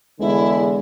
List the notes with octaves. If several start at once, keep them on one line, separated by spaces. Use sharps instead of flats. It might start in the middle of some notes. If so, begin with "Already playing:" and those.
E2 D3 G#3 E4